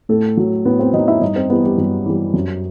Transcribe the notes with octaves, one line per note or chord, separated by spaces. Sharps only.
A2 A3 A4
F#3
A2 B3 B4
C4 C5
F#3 D#4 D#5
E4 E5
G2 D#4 D#5
C4 C5
E3 G3 B3 B4
G3 G4
G2 F#3 F#4
E3 G3
F#2